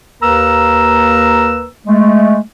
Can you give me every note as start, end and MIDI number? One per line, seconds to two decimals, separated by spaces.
0.21 1.66 39
0.21 1.66 58
0.21 1.66 70
0.21 1.66 71
0.21 1.66 82
0.21 1.66 88
1.86 2.39 56
1.86 2.39 57